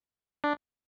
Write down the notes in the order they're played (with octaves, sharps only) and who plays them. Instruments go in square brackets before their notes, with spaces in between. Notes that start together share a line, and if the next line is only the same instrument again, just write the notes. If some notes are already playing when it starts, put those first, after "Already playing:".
[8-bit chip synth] D4